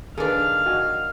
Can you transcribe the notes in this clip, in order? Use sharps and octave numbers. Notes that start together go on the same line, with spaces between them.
D#3 D4 G#4 A4 B4 F5
F#4 D#5 G#5